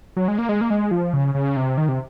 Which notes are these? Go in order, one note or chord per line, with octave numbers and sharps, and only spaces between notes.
F#3
G#3
A#3
G#3
A#3
G#3
F3
C#3
C#3
C3
D#3
C3